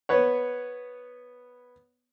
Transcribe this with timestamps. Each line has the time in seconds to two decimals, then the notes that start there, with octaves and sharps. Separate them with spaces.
0.09 B3 B4 C#5